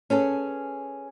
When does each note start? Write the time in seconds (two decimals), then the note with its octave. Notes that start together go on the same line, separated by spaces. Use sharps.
0.10 C#4 G#4 A4 B4